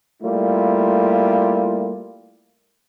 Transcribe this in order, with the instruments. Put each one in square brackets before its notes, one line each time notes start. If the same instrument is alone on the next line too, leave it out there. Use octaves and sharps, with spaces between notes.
[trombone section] G3 A3 A#3 E4 F4